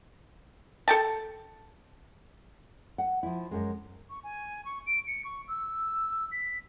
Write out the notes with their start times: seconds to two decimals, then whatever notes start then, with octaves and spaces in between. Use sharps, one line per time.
0.88 A4 G5 A5
2.98 F#5
3.23 F3 E4
3.51 F#2 G#3
4.09 C#6
4.23 G#5
4.64 C#6
4.86 D7
5.07 C#7
5.24 C#6
5.47 E6
6.31 B6